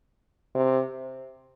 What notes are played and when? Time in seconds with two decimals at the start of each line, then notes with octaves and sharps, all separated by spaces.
0.55 C3